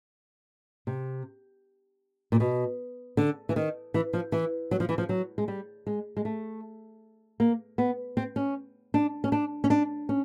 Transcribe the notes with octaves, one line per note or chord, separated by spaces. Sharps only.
C3
A#2
B2
D3
E3
D#3
E3
F3
E3
F#3
F3
E3
F3
F#3
G#3
G3
G#3
G#3
A3
A#3
B3
C4
C#4
D4
C#4
D4
C#4
D4
C#4